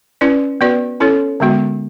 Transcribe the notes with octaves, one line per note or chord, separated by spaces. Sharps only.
C#4 E4 B4 D5
B3 F#4 B4 D5
C#4 E4 A4 C#5
D3 G#3 B3 F#4